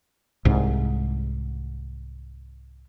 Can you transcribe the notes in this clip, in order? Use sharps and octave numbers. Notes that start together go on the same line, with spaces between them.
C2 G#2